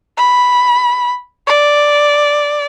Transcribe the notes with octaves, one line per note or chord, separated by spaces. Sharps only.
B5
D5